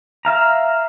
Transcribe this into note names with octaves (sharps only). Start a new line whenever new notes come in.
E5 F5 A#5